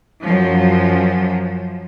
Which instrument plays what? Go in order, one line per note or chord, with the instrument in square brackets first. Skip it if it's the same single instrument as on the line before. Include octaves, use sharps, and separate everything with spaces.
[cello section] F#2 F3